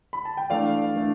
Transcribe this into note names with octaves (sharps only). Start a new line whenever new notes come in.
B5
A5
G5
E3 A3 D4 D5 F5
E3 A3 D4